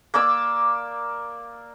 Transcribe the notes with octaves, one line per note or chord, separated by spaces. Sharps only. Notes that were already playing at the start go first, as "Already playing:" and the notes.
A#3 D5 D6 E6